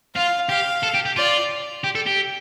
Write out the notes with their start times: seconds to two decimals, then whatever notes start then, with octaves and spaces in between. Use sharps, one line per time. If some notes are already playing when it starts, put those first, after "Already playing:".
0.16 F4 F5
0.49 G4 F5
0.83 A4
0.94 G4
1.06 G4
1.16 F4 D5
1.84 G4
1.95 A4
2.07 G4